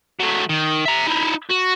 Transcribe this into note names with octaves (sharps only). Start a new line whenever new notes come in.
F#3 A3
D#3
E5 A#5
D#4 E4
F#4